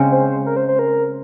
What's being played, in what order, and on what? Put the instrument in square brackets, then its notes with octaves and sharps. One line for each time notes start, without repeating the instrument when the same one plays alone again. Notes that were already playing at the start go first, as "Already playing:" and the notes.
Already playing: [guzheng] C#3 G#3 C4
[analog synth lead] C5
A#4
C5
C5
A#4